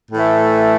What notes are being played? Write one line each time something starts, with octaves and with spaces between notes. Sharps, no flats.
A2 E3 A3